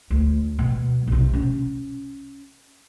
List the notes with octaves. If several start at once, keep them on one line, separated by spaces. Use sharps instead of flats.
D2
B2
B1 C3
C#4